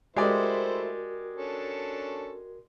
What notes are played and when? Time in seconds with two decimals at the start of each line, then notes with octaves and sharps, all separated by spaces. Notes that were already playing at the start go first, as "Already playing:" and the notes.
0.16 G#3 A3 E4 F#4 G4 A#4 C5 D5
1.36 C#4 D4 A4